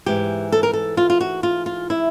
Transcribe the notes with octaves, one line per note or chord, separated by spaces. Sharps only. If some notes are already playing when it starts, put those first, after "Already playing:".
G#2 E3 G4
A4
A#4
A4
F4
F4
F#4
F4
F4
E4